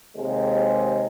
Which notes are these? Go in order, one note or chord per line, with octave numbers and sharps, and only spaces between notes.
D#2 C3 G#3